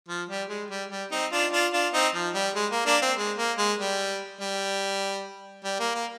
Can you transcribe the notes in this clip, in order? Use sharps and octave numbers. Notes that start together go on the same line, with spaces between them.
F3
G3
G#3
G3
G3
C4 D#4
D4 F4
D4 F4
D4 F4
C4 D#4
F3
G3
G#3
A#3
A#3 D4
C4
G#3
A#3
G#3
G3
G3
G3
A#3
A#3